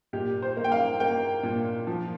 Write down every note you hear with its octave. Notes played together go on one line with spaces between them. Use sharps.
A#2 G4
C5
A#3
G5
F5
A#3 G5
A#2
F3